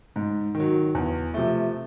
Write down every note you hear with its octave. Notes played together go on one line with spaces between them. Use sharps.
G#2
D#3
F#3
E2
C3 F3 A3